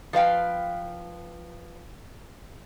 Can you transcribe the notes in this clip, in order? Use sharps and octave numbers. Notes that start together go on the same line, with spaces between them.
F3 B4 F5 G5